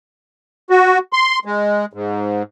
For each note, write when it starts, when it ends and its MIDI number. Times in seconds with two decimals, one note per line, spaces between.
0.70 0.98 66
1.13 1.39 84
1.45 1.86 56
1.93 2.43 44